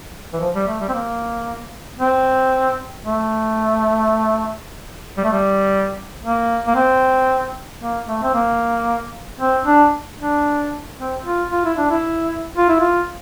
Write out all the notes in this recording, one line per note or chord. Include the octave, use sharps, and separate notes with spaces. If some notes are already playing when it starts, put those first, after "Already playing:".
E3
F3
G3
A3
G3
C4
A#3
C4
A3
G3
A3
G3
A#3
A#3
C4
A#3
A3
C4
A#3
C4
D4
D4
C4
F4
F4
E4
D4
E4
F4
E4
F4